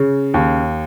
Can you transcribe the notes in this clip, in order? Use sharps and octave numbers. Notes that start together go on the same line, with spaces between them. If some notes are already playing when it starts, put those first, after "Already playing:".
Already playing: C#3
D#2